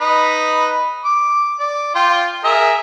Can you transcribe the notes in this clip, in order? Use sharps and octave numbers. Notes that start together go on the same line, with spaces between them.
D#4 B4 B5
D6
D5
F4 G5 C6
G#4 A#4 E5